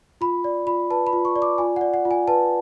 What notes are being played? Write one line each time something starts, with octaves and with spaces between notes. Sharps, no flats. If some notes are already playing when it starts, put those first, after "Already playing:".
F4 B5
D5
F4 B5
B4 A5
B5
F4
C#6
D5
D6
F4 G#5
F#5
D5
F#5
F4
G#5
B4 A5